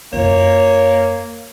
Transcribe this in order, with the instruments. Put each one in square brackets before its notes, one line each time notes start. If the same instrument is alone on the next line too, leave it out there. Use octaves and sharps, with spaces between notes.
[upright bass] F#2 F4 [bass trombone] A#3 [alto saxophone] C#5